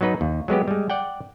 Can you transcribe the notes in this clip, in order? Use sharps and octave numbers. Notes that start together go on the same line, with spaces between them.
F#3 B3 D#4 B4
D#2
F#3 G#3 B3 G4
G3 G#3
D5 F#5 G5